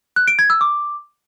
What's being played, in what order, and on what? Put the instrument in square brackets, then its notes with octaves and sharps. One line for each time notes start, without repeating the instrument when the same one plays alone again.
[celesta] F#6
D7
G#6
E6
D6